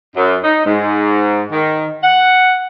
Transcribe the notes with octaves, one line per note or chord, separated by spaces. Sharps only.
F#2
D#4
G#2
D#3
F#5